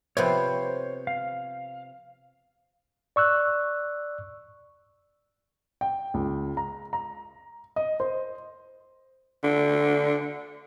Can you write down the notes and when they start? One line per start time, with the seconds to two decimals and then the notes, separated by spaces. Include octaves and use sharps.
0.17 C3 F3 B3 C5 C#5
1.07 F5
3.16 D5 C#6 E6 F#6
5.81 G5
6.14 C#2
6.57 A#5
6.93 A#5
7.76 D#5
8.00 C5
9.44 D3